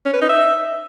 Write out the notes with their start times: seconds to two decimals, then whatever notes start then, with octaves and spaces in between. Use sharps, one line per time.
0.05 C#4
0.13 B4
0.21 D#4
0.29 E5